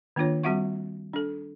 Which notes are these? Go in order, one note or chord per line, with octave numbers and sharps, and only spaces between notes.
D#3 A#3 D4 F4 C#5
G3 C4 F#4 E5 F#5 C#6
D4 A4